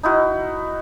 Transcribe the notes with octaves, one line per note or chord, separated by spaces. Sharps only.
D#4 E4 F#4